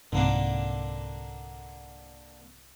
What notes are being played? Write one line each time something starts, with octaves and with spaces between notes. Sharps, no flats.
C2 G#2 D3 A#3 D4